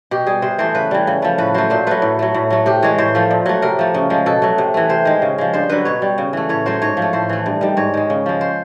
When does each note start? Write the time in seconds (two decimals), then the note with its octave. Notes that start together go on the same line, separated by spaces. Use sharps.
0.11 B2 G4
0.26 G3 G#4
0.42 C3 C5
0.58 E3 A3 C5
0.75 C#3 B4
0.91 E3 G3
1.07 C#3
1.22 F3 A3
1.38 A2 B4
1.54 F#3 A3 C5
1.70 A#2 C5
1.87 F#3 A3 B4
2.02 A2
2.19 F#3 A3
2.34 A2
2.50 F#3 A3
2.66 C3 G4
2.82 E3 G#3 C#5
2.98 A2 C5
3.15 F3 A3
3.31 A#2
3.46 F#3 A3
3.62 C3 A#4
3.79 F3 A3
3.94 C#3
4.10 F3 G#3
4.26 B2 A4
4.42 F#3 A3
4.58 C3
4.74 E3 A3
4.89 C3 C5
5.05 D#3 G#3
5.22 C#3
5.38 F3 G#3
5.53 G2 C5
5.69 D3 F#3 B4
5.85 B2 C#5
6.02 G3
6.18 C#3
6.33 E3 A3
6.49 A2 C#5
6.66 F#3 A3 C5
6.82 G#2 C#5
6.97 F3
7.02 A3
7.13 A2 C5
7.29 E3 A3
7.46 G2
7.61 D#3 G3
7.77 G#2 C#5
7.94 D#3 G#3
8.10 C#3
8.26 F3 G#3
8.41 C5